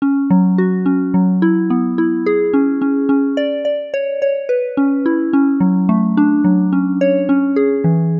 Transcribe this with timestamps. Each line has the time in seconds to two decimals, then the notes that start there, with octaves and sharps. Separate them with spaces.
0.02 C#4
0.30 F#3
0.58 F#4
0.86 C#4
1.14 F#3
1.42 E4
1.70 B3
1.98 E4
2.26 G#4
2.54 C#4
2.82 C#4
3.09 C#4
3.37 D5
3.65 D5
3.94 C#5
4.22 C#5
4.49 B4
4.77 C#4
5.06 E4
5.33 C#4
5.60 F#3
5.89 A3
6.17 D4
6.44 F#3
6.73 C#4
7.01 C#5
7.29 C#4
7.56 G#4
7.84 E3